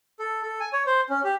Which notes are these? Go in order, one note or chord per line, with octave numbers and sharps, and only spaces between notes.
A4
A4
G#5
C#5
C5
C#4
G4